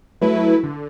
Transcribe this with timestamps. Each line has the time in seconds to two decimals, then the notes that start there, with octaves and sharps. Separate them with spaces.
0.22 F#3 A3 E4 B4
0.64 D3